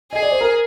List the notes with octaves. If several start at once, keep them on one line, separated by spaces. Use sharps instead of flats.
G#4 D#5
D5
C5
A#4